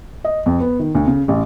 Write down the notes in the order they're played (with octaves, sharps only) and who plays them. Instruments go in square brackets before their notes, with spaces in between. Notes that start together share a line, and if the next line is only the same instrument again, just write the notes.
[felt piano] D#5
F2
B3
D#3
D2
C#3
A1